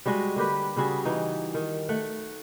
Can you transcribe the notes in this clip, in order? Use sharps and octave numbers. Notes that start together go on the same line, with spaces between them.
G3 G#3 F#4 D#5
D3 A#3 G4 B4
C#3 G3 F#4 G#4
E3 D#4
D#3
A3 F#5